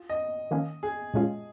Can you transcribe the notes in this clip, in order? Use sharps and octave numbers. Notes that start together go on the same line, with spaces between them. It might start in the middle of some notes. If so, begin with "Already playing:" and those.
Already playing: F4
D#5
D#3 A#3 C#4
G#4
A#2 G#3 C#4 F4